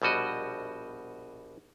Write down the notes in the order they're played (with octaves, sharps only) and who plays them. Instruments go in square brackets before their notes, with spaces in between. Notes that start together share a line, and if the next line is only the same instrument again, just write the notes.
[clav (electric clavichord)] A#1 B2 G3 F#4 D#5